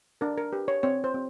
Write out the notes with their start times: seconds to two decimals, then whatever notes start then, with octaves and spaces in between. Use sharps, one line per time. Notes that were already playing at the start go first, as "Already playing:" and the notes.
0.21 D4 A#4
0.38 A#4
0.52 G4 B4
0.68 C#5
0.83 C4 C#5
1.04 C5
1.14 C4